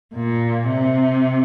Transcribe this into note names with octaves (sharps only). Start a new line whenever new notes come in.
A#2
C3